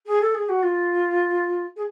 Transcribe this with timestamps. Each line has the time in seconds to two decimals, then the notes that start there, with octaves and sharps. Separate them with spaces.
0.06 G#4
0.21 A4
0.34 G#4
0.48 F#4
0.62 F4
1.76 G#4